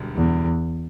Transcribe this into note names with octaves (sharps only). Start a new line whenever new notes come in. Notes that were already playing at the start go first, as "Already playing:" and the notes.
Already playing: E1 D2 G3
E2